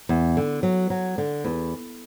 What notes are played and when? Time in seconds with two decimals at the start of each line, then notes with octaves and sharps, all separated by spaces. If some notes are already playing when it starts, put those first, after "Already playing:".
0.09 E2
0.37 D3
0.63 F#3
0.90 F#3
1.18 D3
1.44 E2